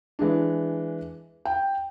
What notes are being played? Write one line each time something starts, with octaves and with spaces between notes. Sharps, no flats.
E3 G#3 D4
G5